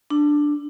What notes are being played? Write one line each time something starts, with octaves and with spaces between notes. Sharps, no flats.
D4